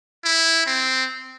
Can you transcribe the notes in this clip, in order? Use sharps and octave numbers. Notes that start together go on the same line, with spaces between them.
E4
C4